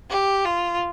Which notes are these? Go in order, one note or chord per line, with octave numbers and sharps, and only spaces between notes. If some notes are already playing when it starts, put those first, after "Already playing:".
G4
F4